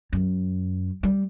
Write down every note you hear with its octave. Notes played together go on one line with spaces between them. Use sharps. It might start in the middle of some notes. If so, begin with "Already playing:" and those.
F#2
G3